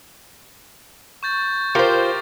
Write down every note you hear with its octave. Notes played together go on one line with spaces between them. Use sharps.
C#6 G6 A6
F4 G4 A#4 C5